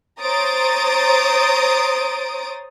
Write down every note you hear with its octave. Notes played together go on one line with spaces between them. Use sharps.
C5 C#5 A#5 D#6 A6 D7